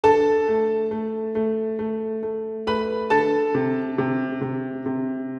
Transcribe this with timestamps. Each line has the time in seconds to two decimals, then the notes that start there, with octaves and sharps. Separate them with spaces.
0.04 D3 A4 A5
0.48 A3
0.91 A3
1.35 A3
1.79 A3
2.23 A3
2.67 A3 B4 B5
3.10 D3 A4 A5
3.55 C3
3.98 C3
4.41 C3
4.86 C3